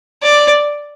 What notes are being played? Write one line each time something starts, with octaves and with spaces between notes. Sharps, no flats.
D5